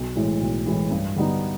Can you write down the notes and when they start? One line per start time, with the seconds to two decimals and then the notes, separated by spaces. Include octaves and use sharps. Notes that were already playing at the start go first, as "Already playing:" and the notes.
Already playing: B1
0.16 A2 E3 G#3
0.41 B1
0.66 A2 E3 G#3
0.91 G2
1.16 D3 G3 B3 D#4